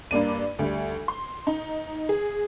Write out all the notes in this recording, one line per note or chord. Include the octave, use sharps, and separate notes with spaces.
G2 A#3 D4 D#7
D2 G3
C6
D#4
G#4